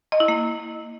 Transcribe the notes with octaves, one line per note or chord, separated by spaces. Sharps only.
D#5
E4
A#3